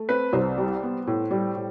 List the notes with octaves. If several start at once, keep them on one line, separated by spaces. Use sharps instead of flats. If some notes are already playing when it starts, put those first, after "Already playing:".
Already playing: A3
C4 B4
C2 C5
G3
B3
A2
G3
A2